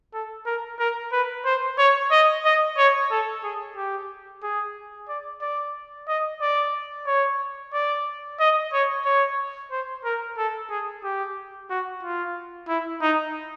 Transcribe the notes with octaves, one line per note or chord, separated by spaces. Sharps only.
A4
A#4
A#4
B4
C5
C#5
D#5
D#5
C#5
A4
G#4
G4
G#4
D5
D5
D#5
D5
C#5
D5
D#5
C#5
C#5
C5
A#4
A4
G#4
G4
F#4
F4
E4
D#4